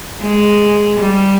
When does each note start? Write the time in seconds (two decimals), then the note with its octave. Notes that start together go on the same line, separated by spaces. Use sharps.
0.22 G#3
1.00 G3